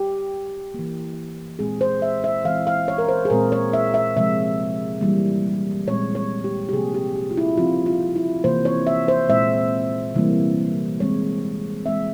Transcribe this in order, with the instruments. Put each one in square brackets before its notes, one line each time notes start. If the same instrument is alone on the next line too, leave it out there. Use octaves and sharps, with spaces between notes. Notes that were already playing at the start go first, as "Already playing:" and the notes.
Already playing: [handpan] G4
E3 A#3
A#2 G#3 C4 G#4
C5
E5
E5
E3 G#3 C4 F5
F5
C#5
A#4
C5
G#4
A#2 G#3 C4 A#4
C#5
E5
E5
C3 F3 G#3 E5
E3 G3 A#3
A#2 G#3 C4 C#5
C#5
G4
G4
C3 F3 A#3 G#4
G4
G4
F4
E4
C#3 F3 C4 F4
F4
E4
C3 E3 A#3 C5
C#5
E5
C5
A#2 G#3 C4 E5
C3 E3 G3 A#3
E3 G#3 C4 C#5
E3 G#3 C4 E5